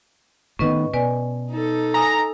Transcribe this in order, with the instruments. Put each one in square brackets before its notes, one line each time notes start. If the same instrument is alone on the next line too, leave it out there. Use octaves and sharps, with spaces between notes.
[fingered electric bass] A2 D#3 B3 [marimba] C#4 B4 D#5
[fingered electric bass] B2 [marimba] B4 D5 G#5
[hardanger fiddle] D#4 A4
[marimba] G#5 D#6 [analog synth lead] A#5